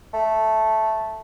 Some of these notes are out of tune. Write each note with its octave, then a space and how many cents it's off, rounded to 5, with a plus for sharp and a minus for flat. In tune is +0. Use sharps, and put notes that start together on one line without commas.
A3 -5